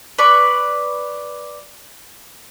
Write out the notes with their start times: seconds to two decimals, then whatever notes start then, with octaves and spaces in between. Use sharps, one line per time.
0.19 B4 D5 C#6